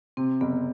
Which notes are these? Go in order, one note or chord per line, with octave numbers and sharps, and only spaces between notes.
C3 C4
F#1 B3